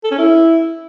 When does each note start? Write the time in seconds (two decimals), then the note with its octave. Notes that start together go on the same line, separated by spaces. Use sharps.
0.04 A4
0.11 C#4
0.18 E4